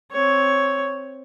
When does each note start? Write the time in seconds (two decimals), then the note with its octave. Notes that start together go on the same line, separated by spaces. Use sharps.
0.12 C4 C#5